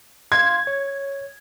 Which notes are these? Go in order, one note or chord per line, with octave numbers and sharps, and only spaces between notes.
F5 C6 G#6
C#5